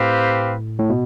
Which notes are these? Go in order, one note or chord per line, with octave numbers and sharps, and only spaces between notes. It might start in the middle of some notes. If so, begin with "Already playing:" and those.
Already playing: A2 C4 G4 B4 F5
A2
B2